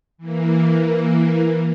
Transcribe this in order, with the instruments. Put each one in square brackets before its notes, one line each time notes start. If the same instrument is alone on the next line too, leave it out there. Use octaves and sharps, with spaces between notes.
[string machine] E3 A#3